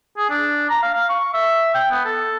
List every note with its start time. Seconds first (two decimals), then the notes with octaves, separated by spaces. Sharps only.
0.17 G#4
0.30 D4
0.70 A#5
0.82 F5
0.94 F5
1.09 C#6
1.33 E5
1.74 G5
1.91 B3
2.05 A4